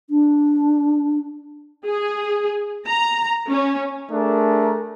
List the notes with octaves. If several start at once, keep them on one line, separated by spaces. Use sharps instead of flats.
D4
G#4
A#5
C#4
A3 D4 G#4 A#4